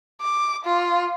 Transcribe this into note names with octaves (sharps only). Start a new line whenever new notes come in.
D6
F4